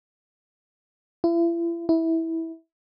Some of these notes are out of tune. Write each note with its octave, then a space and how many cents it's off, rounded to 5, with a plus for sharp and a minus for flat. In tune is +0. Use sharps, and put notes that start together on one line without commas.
E4 +40
E4 -15